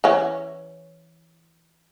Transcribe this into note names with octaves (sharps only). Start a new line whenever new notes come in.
E3 C#4